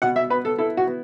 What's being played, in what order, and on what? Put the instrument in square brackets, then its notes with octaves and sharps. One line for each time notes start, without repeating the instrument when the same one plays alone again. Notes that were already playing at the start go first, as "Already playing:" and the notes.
[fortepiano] B2 F#5
E5
B3 B4
A4
E4 A4
F#4
B3